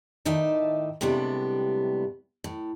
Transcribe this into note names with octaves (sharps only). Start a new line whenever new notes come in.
A2 D#3 D#4 D5 E5 A5
A2 C3 G3 G#3 B3 D4
A2